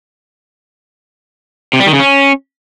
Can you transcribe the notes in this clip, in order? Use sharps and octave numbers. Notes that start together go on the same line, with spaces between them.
C3
G3
D#3
C#3
C#4